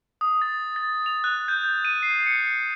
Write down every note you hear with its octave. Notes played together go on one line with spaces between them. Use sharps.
D#6
A6
A6
F7
F#6
G6
D#7
C7
C#7